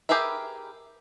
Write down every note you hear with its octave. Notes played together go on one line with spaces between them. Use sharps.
G4 G#4 A#4 B4 E5